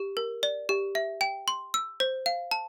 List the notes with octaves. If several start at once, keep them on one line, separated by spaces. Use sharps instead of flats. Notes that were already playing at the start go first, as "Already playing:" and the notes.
Already playing: G4
A#4
D5
G4
E5
G5
C6
E6
C5
F5
A5